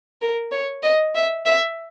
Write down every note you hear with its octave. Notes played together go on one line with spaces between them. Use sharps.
A#4
C#5
D#5
E5
E5